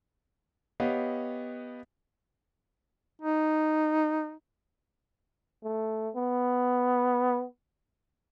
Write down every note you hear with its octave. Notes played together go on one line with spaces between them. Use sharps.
B3 G4 C#5 D#5 F5 F#5
D#4
A3
B3